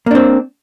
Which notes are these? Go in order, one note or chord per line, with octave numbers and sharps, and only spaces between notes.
A#3 C4 D4